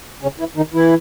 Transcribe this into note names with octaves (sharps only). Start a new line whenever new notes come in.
C#3 C#4
E3 E4
D#3 D#4
E3 E4